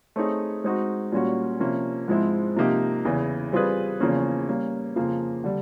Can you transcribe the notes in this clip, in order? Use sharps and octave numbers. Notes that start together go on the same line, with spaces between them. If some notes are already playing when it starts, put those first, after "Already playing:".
A3 C4 D#4 G#4 C#5
G#3 C4 D#4 F#4
A#2 G3 A#3 C#4 F#4
C3 F3 A#3 C#4
G#2 F3 G#3 C4 E4
C3 F3 A#3 D#4 G4
E2 C#3 E3
G3 C4 F4 G#4 B4
E2 C#3 F3 A#3 C#4
G3 A#3 C#4
F2 C#3 F3 A#3
D3 G3